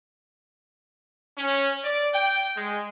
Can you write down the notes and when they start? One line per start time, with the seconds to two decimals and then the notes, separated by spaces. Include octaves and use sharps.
1.38 C#4
1.84 D5
2.14 G5
2.56 G#3